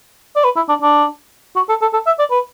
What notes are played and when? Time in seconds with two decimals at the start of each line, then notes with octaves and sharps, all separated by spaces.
0.36 D5
0.44 B4
0.56 E4
0.69 D4
0.82 D4
1.56 F#4
1.69 A4
1.82 A4
1.93 A4
2.06 E5
2.19 D5
2.31 B4